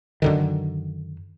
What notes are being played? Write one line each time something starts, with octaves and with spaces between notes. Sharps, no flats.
F#2 D3 D#3